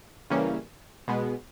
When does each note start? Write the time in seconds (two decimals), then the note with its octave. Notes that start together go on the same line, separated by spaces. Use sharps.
0.30 C#3 E3 G3 A#3 C#4
1.08 B2 G#3 B3